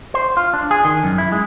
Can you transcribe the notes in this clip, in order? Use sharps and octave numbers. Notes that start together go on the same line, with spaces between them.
C5
F4
D4
G#4
D#3
F#2
E4
G#3